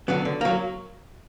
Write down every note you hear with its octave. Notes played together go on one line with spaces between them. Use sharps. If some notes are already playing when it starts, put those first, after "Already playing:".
D3 F#3 B3
D3
F#3 A#3